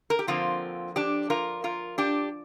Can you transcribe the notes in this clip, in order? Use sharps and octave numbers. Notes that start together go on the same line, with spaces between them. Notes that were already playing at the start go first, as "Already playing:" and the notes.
A#4
G4
D3 F3 A#3 C4 F4
D4 G4
F4 A#4
F4 A#4
D4 G4